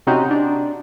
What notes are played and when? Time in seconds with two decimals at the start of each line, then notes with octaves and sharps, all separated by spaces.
0.07 C3 C4 C#4 D#4 F#4 C5
0.31 D4